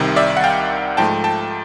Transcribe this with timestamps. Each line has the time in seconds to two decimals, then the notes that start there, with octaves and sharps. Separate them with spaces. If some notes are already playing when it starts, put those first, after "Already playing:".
Already playing: C2 C3 D#3
0.16 D5 E5
0.37 F#5
0.44 F5 G5
0.97 G#2 F3 A3 G5 A5
1.24 G5 A5